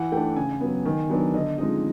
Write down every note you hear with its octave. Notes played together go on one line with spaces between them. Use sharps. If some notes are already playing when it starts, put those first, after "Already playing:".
Already playing: E3 F#5
A3 D4 G5
C#3 G#5
F#3 B3
D#3
F#3 B3 D4
D3 D#5
F3 G#3 C4 D#4 D#5